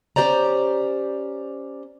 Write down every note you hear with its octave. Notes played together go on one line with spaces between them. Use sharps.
C#4 E4 G4 C5 D5 A#5